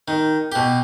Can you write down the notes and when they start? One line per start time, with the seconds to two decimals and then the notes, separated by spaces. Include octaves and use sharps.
0.08 D#3
0.52 B2 G4